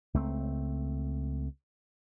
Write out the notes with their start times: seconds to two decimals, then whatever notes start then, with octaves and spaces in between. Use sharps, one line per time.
0.14 C#2 A3 C4